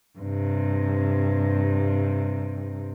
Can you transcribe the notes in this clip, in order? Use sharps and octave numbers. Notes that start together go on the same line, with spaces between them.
G2 C3